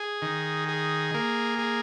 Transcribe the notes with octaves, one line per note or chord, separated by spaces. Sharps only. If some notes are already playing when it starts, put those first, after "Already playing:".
Already playing: G#4
D#3
G#4
A#3
G#4